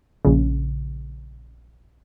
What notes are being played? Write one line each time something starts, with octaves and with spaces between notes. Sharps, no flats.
A#1 C#3